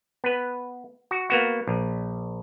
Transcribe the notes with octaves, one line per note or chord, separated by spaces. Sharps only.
B3 B4
F#4
A#3 B3 F#4
A#1